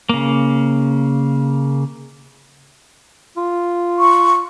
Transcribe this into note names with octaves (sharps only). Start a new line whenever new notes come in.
C#3 A#3
F4
C#6